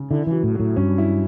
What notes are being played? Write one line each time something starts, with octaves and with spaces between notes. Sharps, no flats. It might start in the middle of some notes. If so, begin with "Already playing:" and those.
Already playing: C#3
D3 E4
E3 F#3
A2
A2 F#3
G2 C#4
E4